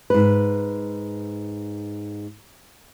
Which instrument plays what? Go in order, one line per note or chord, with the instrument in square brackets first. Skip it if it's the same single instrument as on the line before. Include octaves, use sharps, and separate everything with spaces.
[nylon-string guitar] G#2 B4